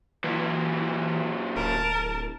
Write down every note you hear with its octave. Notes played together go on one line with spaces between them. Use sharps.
A#2 E3 F#3
D1 A#4 A5